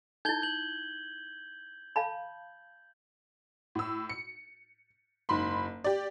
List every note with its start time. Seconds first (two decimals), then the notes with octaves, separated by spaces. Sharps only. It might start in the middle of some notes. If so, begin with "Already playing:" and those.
0.25 D#4 E4 G6 G#6 G7
0.42 G6 F#7
1.96 F5 A5 B5
3.75 A2 E6
4.09 C#7
5.29 F#1 G#2 B5 C6
5.84 G4 D5